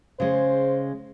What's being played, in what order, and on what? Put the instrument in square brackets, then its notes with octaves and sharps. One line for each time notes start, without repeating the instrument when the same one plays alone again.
[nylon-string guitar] C#3 G#3 [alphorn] C5